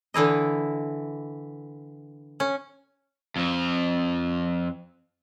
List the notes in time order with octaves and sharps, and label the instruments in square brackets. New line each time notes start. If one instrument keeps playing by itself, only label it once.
[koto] D3 E3 E4 D#5
C#4
[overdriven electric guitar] F2 F3